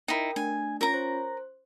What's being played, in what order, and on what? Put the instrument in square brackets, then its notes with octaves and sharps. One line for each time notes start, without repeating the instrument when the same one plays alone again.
[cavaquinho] D#4 E4 [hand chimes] A#4 G5
[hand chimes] A3 D4 [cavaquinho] G#5
[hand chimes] C#4 F4 C#5 [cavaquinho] A#4 A#5
[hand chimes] C5